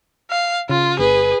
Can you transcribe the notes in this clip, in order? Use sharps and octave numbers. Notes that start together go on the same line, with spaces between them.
F5
C#3 F4
G1 G#4 B4